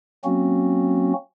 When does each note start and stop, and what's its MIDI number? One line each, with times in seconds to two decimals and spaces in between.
0.25 1.13 54
0.25 1.13 58
0.25 1.13 60
0.25 1.13 61
0.25 1.13 66